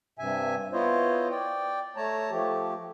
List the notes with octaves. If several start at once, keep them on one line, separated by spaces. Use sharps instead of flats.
G2 C3 E5 G#5
B3 E4 F4 C5 C#5 D#5
D5 G5
A3 C#5 A5 A#5
F3 A3 G4